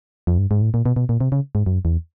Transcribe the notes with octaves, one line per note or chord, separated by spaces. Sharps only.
F2
G2
G#2
A2
A#2
B2
B2
A#2
C3
C#3
G#2
F#2
E2